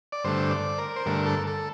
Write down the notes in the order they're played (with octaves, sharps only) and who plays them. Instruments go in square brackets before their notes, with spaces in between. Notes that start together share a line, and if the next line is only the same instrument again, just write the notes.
[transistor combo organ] D5
G2 D3 A3 C5
D5
A#4
C5
G2 D3 A3 A#4
A4
A4